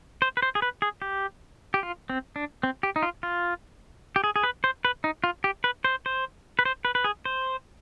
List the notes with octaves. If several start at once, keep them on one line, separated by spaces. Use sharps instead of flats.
C5
B4
C5
G#4
B4
G#4
G4
G4
F4
C4
D4
C4
G4
D#4
F4
F4
G4
G#4
G#4
B4
C5
B4
D#4
F4
G4
B4
C5
C5
B4
C5
B4
B4
G#4
C5